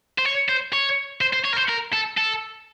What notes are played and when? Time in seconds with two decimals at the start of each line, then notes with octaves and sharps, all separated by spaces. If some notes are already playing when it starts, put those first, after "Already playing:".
0.18 C5
0.25 C#5
0.49 C5
0.73 C#5
1.21 C5
1.33 C5
1.45 C#5
1.53 A#4
1.57 C5
1.69 A#4
1.93 A4
2.18 A4